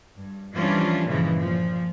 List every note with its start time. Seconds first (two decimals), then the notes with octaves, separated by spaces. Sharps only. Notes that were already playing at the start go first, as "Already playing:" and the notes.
0.18 G2
0.53 E3 F3 G3 C#4 D4 F4
1.07 G2 A#2 C#3 E3 F3 G#3
1.39 A#2 F3